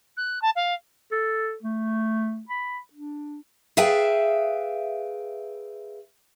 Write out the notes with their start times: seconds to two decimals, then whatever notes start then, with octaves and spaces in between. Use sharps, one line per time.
0.17 F#6
0.42 A5
0.56 F5
1.12 A4
1.63 A3
2.49 B5
2.93 D4
3.77 G#4 B4 E5 F5 G5 A5